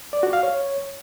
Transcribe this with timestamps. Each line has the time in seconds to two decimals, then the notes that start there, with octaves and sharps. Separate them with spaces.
0.13 D5
0.23 F#4
0.33 F5
0.43 C#5